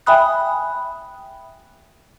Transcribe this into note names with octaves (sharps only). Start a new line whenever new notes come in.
E5 G5 G#5 B5 D#6 F#6